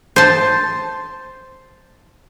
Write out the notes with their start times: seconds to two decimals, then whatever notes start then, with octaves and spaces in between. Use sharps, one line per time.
0.16 C5 A5